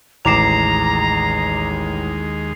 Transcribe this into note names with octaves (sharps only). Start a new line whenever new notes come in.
A1 D#2 G#3 A#5 D6 C7 E7 F7